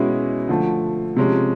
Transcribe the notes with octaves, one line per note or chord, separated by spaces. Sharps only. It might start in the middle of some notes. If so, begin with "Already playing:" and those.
Already playing: B2 G#3 C#4 E4
D3 F3 A3
C3 F3 G#3 C#4